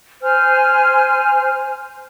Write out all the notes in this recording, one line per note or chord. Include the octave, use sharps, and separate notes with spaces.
C5 G#5 F6